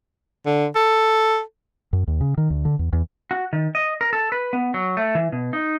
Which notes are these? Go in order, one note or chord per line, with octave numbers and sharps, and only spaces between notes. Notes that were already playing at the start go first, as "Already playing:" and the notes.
D3
A4
F#2
D#2
C#3
D#3
D2
D3
E2
E2
F#4
D#3
D#5
A#4
A4
B4
B3
F#3
A3
E3
B2
D#4